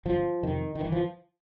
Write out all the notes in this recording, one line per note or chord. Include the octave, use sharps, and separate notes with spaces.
G1 F3
F2 C3 D#3
D#3
G1 E3
F3